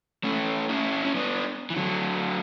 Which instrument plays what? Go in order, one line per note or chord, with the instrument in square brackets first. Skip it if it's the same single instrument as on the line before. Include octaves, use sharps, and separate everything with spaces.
[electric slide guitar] A3 C#4
C#4 E4
C#4
B3 D4
E3
D3 F#3